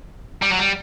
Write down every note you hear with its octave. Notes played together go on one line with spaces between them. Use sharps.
G3
F#3
G3